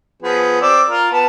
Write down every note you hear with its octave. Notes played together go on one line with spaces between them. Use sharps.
F3 B3 G#4
C4 D5 E6
F4 A#4
B3 A5